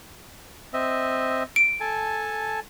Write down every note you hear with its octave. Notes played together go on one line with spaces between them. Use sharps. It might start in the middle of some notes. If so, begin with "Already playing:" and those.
C4 D#5 E5
D7
A4 G#5 A5